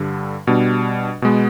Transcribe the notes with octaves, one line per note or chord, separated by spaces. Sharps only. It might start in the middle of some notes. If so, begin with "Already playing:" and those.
Already playing: G2 D3 G3
B2 G3 D4
B2 G#3 B3